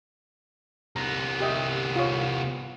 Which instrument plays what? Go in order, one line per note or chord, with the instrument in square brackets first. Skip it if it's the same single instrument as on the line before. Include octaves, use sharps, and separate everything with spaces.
[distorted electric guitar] C2 B3 [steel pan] A#5
[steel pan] G4 D#5 E5
F4 C#5